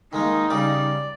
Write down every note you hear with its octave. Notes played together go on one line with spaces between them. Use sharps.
D#3 G#3 A#3 D#4
C#3 G3 D5 D6